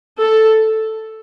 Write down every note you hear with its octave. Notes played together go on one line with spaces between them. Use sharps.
A4